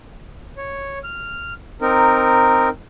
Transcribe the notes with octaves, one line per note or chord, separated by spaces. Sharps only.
C#5
F6
C4 D#4 A#4